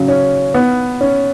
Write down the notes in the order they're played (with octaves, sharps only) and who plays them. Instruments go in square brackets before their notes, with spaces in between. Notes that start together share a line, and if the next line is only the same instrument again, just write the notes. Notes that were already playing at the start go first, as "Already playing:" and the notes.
Already playing: [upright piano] C#3 F#3
C#4
B3
C#4